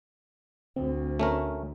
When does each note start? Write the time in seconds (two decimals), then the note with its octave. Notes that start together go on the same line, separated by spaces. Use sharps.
0.76 D2 C4
1.20 A3 C#4 A#4